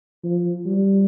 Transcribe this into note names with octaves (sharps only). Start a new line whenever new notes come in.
F3
G3